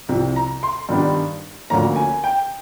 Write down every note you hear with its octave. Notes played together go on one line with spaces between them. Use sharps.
C2 C3 F3
A#5
C6
G2 D#3 G3 B3 D4
D2 D3 F3 A#3 C#4 A#5
G#5
G5